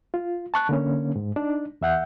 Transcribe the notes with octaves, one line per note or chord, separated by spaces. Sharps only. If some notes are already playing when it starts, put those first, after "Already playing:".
F4
A5 C#6 F#6
D3 A#3 C#4
G#2
D4 D#4
E2 E5 F#5 G6